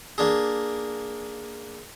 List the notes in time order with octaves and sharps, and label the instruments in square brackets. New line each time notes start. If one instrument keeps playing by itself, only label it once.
[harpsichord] A#3 D4 G#4